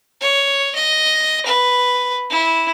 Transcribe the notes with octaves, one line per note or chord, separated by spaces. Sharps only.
C#5
D#5
B4
E4